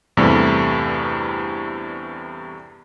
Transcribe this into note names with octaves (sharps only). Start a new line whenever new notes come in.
E2 G2 C3 G3 A3